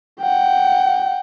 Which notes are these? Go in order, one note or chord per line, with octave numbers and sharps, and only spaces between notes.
F#5 G5